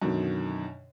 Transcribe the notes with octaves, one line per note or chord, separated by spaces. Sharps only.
F#2 B2 D3 D#3